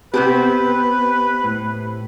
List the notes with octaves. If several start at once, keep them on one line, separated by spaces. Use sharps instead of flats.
C3 B3 C4 G4 B4
A2